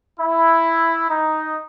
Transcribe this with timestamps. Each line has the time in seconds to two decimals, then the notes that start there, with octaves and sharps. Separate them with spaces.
0.19 E4
1.08 D#4